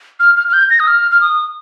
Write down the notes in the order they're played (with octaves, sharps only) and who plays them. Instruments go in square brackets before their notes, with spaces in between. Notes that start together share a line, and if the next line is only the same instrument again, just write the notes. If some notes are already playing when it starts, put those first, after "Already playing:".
[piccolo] F6
F6
F6
G6
A#6
D#6
F6
F6
D#6